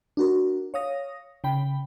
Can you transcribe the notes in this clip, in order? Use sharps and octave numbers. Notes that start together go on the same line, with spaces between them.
D4 F#4 A#4
C#5 F5 D#6 A#6
C#3 G5 B5